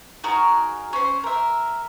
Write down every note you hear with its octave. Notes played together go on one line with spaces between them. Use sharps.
D#4 F#4 G#4 A#4
C#4 C5
A#4 E5